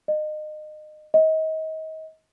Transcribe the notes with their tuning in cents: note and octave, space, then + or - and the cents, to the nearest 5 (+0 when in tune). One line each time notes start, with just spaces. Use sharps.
D#5 -30
D#5 +30